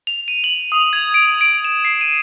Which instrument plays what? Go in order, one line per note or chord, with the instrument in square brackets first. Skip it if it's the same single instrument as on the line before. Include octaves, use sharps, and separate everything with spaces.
[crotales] F7
D#7
F#7
D#6
G#6
D7
D7
E7
C7
D#7